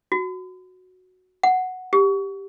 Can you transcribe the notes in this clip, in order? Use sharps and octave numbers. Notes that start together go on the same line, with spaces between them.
F#4
F#5
G4